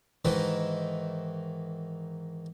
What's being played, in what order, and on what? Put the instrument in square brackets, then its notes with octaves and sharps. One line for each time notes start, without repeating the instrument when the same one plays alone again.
[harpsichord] G#2 D#3 E3